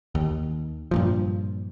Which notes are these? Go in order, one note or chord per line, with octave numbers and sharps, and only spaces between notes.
D#2
G2 A#2 F3